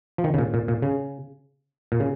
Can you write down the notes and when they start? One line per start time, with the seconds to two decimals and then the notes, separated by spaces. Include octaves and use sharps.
0.18 F3
0.24 D#3
0.34 C#3
0.39 A#2
0.54 A#2
0.68 A#2
0.82 C#3
1.92 A#2
2.00 C#3